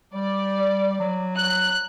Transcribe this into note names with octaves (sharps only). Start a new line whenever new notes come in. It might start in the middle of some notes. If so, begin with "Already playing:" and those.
G3 D5
F#3
F#6